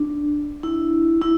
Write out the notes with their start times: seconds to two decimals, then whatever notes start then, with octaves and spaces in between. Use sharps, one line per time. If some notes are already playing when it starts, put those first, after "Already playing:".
Already playing: D4
0.63 E4
1.22 E4